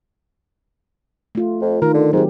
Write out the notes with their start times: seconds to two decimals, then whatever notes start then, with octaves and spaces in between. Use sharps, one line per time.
1.35 A3 F4
1.62 F2
1.82 D#3 F4 A#4
1.94 D3
2.13 G#2 F#3 C4 G4